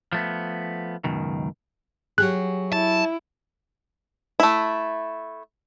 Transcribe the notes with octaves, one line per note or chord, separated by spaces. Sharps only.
F3 A3 B3
C#2 F#2 B2 D#3
F#3 G4 G#4 F#6
E4 A5
A3 E4